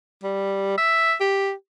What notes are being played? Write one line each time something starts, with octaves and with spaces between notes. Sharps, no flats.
G3
E5
G4